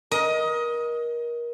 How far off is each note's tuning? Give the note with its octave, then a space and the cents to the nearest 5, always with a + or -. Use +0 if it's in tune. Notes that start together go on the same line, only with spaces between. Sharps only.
A#4 +30 D#5 +15